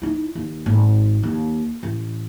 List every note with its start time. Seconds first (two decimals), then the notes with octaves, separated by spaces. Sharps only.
0.02 D#4 E4
0.35 D#2
0.66 G#1
1.23 D#2
1.83 A1